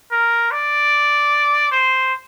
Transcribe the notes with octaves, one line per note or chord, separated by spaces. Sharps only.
A#4
D5
C5